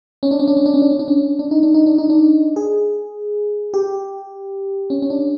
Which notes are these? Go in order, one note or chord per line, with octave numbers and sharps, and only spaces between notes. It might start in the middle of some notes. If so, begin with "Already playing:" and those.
C#4
D4
C#4
D4
C#4
D4
C#4
D4
C#4
D4
C#4
D4
D#4
D4
D#4
D4
D#4
D4
G#4
G4
C#4
C#4
D4